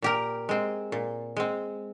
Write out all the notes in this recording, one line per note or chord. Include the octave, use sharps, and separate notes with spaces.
A#2 G4 A#4
G#3 C4
A#2
G#3 C4